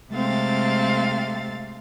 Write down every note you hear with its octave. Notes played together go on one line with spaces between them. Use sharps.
C3 G#3 A3 C4 F5 A6